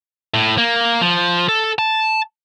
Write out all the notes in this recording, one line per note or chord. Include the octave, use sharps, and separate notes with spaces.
A2
A#3
F3
A4
A5